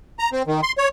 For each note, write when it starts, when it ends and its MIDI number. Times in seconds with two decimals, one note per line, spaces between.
0.19 0.30 82
0.32 0.43 60
0.47 0.61 51
0.63 0.72 84
0.78 0.88 73